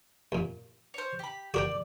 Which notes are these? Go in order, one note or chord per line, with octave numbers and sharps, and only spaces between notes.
F#2 A#2
C5 C#5
G4 B5
F#4 A#4 D5 G5